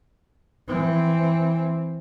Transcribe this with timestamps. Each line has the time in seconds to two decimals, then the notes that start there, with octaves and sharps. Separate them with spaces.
0.68 E3 C4